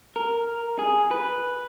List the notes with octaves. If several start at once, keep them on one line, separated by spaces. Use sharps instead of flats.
A#4
G#4
B4